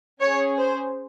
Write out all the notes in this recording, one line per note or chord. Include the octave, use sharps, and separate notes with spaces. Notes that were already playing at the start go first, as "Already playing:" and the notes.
C#4 G#4 C#5
C5